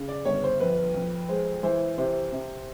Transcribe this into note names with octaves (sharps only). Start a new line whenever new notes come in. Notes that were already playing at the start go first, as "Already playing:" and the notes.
Already playing: C#3
D5
G1 C#5
C5
F2 B4
F2
G#3 C5
E3 C5
C3 C5
C3